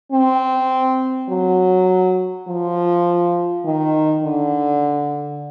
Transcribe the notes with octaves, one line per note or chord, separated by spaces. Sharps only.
C4
F#3
F3
D#3
D3